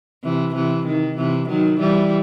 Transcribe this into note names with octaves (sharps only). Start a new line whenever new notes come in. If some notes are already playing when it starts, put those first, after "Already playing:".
C3 E3
C3 E3
D#3
C3 E3
D#3 F#3
E3 G3